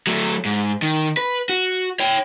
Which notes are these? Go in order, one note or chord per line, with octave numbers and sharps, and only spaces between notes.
F#3 A3
G#2
D#3
B4
F#4
C#5 G5